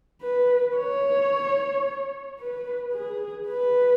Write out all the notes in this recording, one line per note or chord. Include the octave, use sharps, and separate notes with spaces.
B4
C#5
B4
G#4
B4